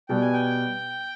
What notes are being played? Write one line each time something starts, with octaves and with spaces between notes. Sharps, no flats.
B2 G3 B3 G5
G#5
G5